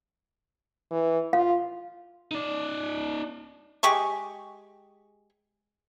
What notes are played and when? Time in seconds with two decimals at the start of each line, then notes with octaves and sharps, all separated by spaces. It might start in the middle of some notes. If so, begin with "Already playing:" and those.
0.91 E3
1.33 F4 F5
2.31 D#4 D5
3.83 G#3 G4 G#4 C#6